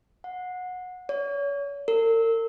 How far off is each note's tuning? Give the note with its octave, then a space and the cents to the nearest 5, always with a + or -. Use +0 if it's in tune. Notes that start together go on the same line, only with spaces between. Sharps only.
F#5 -20
C#5 +35
A#4 -40